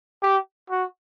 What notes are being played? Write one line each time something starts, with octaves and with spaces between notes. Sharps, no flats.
G4
F#4